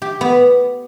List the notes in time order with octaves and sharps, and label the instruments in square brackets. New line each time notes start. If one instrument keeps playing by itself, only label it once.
[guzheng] G4
B3